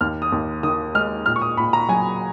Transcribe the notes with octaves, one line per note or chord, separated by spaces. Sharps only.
D#2 F6
D#6
D#2
D#3 D#6
G#3 F6
A#2 F6
C#6
D#6
A#2 B5
A#5
F#3 G#5